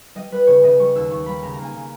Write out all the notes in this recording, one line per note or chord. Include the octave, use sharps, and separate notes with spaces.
G3 D#5
G3 B4
C#3 C#5
C#3 D#5
G3 C#6
D#2 E6
D#2 C#6
G3 B5
C#3 A#5
A#3 A#5
G#5
C#3